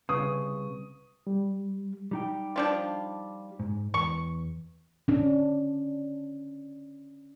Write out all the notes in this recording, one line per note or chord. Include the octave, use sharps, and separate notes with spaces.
C2 C#3 B4 C#6 D#6
G3
G3 D#4 G5
F3 D4 F4
G#2
E2 C#6
C#4 D4